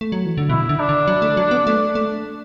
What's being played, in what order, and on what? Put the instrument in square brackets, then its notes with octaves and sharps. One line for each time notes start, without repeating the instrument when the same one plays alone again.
[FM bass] A3
F#3
E3
D3
[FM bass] B2 [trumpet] E4
[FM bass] D3
[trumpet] D4
[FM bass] D3
F#3
A3
F#3
B3
A3
A3